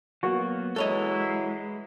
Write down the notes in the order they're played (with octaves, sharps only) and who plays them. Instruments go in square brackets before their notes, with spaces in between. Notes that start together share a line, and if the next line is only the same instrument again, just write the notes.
[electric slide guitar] F#3 A#3 B3 [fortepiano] F#4
[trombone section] E3 F#3 E4 [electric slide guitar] G#3 [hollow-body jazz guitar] A4 C#5 D#5